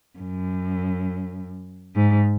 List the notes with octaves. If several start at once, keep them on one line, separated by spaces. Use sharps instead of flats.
F#2
G#2